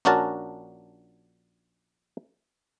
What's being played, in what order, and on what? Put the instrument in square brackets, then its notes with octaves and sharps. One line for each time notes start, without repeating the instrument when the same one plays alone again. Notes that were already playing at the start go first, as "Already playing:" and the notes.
[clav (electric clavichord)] A#1 C#4 D4 F#4 A#4 A5